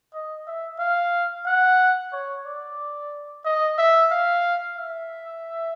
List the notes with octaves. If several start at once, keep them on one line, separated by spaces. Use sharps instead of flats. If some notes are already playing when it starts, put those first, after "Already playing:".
D#5
E5
F5
F#5
C#5
D5
D#5
E5
F5
E5